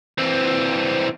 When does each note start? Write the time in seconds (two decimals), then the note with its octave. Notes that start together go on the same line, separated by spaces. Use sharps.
0.18 E3 C4